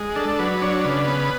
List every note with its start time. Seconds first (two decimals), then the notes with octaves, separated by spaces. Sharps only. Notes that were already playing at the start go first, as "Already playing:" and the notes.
Already playing: G#3
0.16 D4 A4
0.39 F#3 B4
0.62 D4 C#5
0.84 C#3 B4
1.07 B3